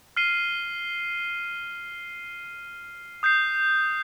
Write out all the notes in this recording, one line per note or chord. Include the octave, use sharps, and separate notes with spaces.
F6 C7 D#7 G7
D#6 G6 C7